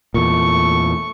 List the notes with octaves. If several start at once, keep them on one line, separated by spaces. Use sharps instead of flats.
E2 A#2 A3 C#6